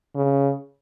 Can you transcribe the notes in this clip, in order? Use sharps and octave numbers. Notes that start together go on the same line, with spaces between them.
C#3